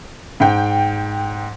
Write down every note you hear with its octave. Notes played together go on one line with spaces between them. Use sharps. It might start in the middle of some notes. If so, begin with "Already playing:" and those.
G#2 G5